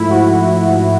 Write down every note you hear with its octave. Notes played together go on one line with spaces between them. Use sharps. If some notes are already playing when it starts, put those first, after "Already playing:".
Already playing: G#2 F3 A3 E4
F#4